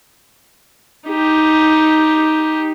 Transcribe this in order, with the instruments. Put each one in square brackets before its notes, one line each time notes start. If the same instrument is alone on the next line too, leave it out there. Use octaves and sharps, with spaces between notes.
[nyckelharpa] D#4 G4